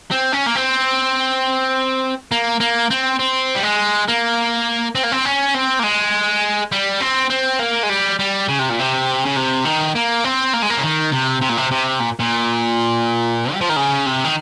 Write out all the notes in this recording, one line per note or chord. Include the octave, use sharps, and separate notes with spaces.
C4
C#4
A#3
C4
A#3
A#3
C4
C4
G3
G#3
A#3
C4
A#3
C4
C#4
C4
A#3
G#3
G3
C4
C4
A#3
G#3
G3
G3
C#3
C3
A#2
C3
C#3
C3
D#3
A#3
C4
A#3
G#3
A#3
C#3
D#3
C3
C3
A#2
C3
C3
A#2
A#2
G3
F3
D#3
C#3
C3
D#3